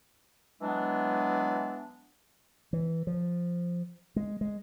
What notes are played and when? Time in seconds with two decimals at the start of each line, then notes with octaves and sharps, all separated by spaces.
0.61 E3 F#3 G#3 B3 D4
2.73 E3
3.07 F3
4.16 G#3
4.41 G#3